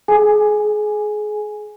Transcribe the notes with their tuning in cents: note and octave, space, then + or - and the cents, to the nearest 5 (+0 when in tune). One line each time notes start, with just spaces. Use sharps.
G#4 +30 G#5 +0